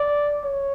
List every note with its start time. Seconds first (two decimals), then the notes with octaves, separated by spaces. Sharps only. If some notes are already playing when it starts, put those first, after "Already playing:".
Already playing: D5
0.44 C#5